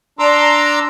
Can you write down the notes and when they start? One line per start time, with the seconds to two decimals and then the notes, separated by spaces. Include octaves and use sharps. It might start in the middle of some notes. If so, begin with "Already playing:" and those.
0.19 D4 A#5 C6 D6 E6